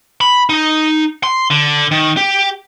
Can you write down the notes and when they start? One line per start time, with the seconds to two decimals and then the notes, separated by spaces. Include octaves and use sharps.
0.21 B5
0.49 D#4
1.23 C6
1.50 D3
1.91 D#3
2.17 G4